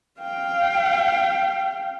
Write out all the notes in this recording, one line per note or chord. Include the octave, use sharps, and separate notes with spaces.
F5 G5